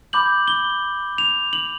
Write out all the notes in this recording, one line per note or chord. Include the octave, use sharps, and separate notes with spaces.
B5 D6 G6 F#7
G7
F7
F#7